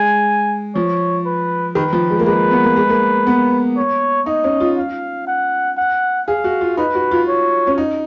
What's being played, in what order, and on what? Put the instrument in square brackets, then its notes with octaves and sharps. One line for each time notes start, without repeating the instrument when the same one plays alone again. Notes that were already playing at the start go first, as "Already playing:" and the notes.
Already playing: [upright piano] G#3 [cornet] G#5
[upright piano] F3 [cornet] C#5
[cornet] B4
[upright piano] D#3 [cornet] B4
[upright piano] F3
G#3
A#3
[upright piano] G#3 [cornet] B4
[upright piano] B3
A#3
G#3
A#3
B3
[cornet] C#5
[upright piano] D#4 [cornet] D#5
[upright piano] C#4
F4
[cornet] F5
F#5
F#5
[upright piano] G#4 [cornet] F5
[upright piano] F#4
F4
[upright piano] D#4 [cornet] B4
[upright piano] F#4
F4
[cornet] C#5
[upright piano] C#4
D#4